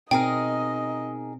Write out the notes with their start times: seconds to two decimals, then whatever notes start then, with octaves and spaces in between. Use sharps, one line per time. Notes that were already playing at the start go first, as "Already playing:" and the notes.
0.11 B2 C4 D#4 G#4 A#4 D#5 G5